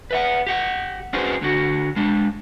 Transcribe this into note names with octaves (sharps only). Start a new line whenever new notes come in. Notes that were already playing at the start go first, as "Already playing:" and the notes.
B4 E5 F#5
G4 F#5
C#4 D#4 F#4 G#4 B4 C5
D3 F#4
G#3 D4